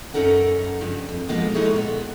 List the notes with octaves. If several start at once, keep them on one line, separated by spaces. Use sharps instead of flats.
F#2 C#4 D#4 A4 A#4 F#5
G2 C#3 F3
F2
B2 D3 F3 G#3 A#3 B3
G#3 D#4 E4 G#4 A4 C#5
A#2 B3